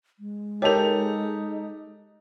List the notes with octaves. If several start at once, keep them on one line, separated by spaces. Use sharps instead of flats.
G#3
D#4 G4 A4 A#4 C#5 F7